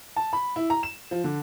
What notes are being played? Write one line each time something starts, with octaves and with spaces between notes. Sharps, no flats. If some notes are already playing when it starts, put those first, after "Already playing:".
A5
B5
E4
A#5
E7
F3
D3